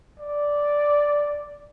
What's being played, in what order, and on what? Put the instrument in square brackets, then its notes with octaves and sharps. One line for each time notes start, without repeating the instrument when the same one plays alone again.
[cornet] D5